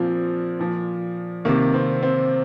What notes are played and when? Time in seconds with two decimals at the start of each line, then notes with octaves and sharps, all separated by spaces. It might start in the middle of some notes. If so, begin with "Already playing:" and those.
Already playing: A#2 F3 C4
0.59 A#2 F3
1.45 C3 D#3 A#3
1.74 C4
2.02 C4